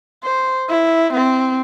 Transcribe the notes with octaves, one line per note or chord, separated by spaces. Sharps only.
C5
E4
C4